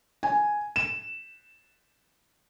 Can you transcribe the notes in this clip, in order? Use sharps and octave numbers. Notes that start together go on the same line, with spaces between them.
G#5
E7